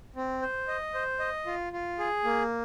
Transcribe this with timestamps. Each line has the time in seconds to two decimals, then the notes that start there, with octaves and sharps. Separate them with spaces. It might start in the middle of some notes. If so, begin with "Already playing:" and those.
0.16 C4
0.42 C5
0.68 D#5
0.94 C5
1.19 D#5
1.46 F4
1.73 F4
1.99 G#4
2.24 A#3